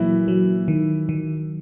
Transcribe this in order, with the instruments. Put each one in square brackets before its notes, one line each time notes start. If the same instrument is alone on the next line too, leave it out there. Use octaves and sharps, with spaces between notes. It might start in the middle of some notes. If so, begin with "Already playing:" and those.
Already playing: [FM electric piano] A#2 F#3 A#3 [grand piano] E3 E4
[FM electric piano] F#3
D#3
D#3